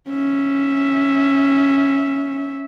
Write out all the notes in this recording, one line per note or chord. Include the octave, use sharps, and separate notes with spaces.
C#4 E5